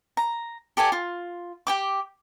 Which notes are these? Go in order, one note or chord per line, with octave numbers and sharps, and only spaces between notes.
A#5
G4 A4 D5 G#5
F4
G4 G5 D6